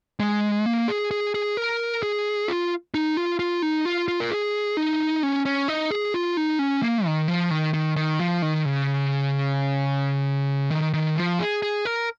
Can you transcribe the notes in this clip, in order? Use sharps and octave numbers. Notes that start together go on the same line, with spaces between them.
G#3
A#3
G#4
G#4
G#4
A#4
G#4
F4
D#4
F4
F4
D#4
F4
F4
A#4
G#4
D#4
C#4
C#4
D#4
G#4
F4
D#4
C#4
A#3
D#3
F3
D#3
D#3
D#3
F3
D#3
C#3
D#3
D#3
F3
G#4
G#4
A#4